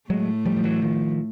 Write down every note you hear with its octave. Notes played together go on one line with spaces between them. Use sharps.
A2 F#3 G#3 A3
F3 G3
F3
E3 F#3
D#3 F3